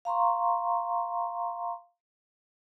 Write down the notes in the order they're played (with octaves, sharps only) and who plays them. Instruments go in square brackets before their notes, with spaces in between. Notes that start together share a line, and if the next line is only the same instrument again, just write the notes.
[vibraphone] F5 A#5 C6 C#6